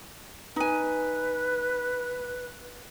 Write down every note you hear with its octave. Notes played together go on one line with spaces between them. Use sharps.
D#4 B4 G#5